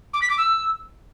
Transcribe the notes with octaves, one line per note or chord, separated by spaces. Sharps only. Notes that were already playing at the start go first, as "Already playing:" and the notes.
D6
B6
D6
E6